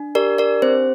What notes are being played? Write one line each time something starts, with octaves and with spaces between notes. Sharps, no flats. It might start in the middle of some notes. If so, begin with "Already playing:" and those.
Already playing: D4
G4 A#4 D5
A#4 D5
C4 C5